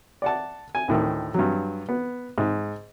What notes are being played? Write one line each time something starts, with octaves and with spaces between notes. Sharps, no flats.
D5 F#5 A5
G#5
D2 A2 D#3
G2 F#3
B3
G#2